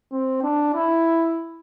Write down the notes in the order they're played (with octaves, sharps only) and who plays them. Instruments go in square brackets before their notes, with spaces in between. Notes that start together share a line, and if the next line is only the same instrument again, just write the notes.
[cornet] C4
D4
E4